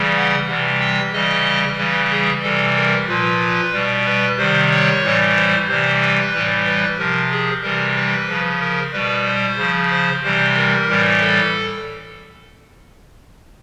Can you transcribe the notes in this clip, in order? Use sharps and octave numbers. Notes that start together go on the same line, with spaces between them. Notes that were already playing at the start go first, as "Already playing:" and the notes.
Already playing: C#3 E3 G3
F#5
C3 E3 G3
G5
C#3 E3 G3 D#5
C#3 E3 G3 B4
G#4
C3 E3 G3 A4
A#4
A#2 F3 B4
B2 G3
B4
C3 D#3 G3 C5
C#5
A2 E3 G3
C5
C3 E3 G3 C5
B4
A2 E3 G3
B4
C3 F3 A#4
G#4
C3 E3 G3 A#4
B4
C#3 F3
A#4
B2 G3 B4
C5
C#3 F3
C5
C3 E3 G3 C5
A#4
A2 E3 G3
A4